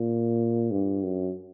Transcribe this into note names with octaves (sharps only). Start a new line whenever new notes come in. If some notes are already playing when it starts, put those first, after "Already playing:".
Already playing: A#2
G2
F#2